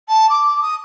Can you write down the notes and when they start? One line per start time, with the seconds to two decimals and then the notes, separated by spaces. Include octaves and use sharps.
0.08 A5
0.29 D6
0.62 D#6